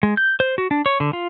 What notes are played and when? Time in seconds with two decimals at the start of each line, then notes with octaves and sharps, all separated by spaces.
0.03 G#3
0.17 G6
0.40 C5
0.58 F#4
0.71 D4
0.86 C#5
1.00 D3
1.13 F4